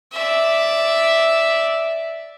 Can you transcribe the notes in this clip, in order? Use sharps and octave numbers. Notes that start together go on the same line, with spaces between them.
D5 E5